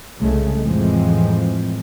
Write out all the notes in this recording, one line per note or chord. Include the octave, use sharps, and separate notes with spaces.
C2 C#3 G#3 A3
F2 A2 E3 F3 G#3 C4